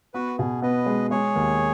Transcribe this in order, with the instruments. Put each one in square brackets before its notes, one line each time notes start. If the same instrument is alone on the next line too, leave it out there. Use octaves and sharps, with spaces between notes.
[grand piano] B3 [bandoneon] F#4 B4
[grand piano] B2 [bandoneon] G#4
[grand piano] B3 [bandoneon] B4 D#5
[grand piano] G#3
[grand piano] G#3 [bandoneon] G#4 C#5
[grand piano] D#2